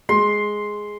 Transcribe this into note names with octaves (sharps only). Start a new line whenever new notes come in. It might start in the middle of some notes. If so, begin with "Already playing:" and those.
G#3 C6